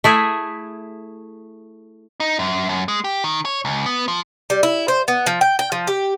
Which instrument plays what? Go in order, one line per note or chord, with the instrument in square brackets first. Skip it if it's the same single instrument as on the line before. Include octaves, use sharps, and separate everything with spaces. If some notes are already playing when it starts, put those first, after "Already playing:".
[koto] A3 E4 G#4
[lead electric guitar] D#4
F#2
F#2
G#3
G4
D#3
C#5
C#2
B3
F3
[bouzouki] G3
E4
C5
B3
F3
G5
G5
F3
G4